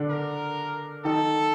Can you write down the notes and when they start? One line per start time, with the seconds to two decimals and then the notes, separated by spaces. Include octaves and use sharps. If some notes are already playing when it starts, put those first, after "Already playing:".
Already playing: D3 D4
0.10 A#4
1.05 D#3 D#4 A4